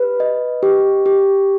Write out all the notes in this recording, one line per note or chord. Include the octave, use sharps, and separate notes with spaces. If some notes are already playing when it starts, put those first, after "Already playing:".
Already playing: G4 B4
D#5
G4
G4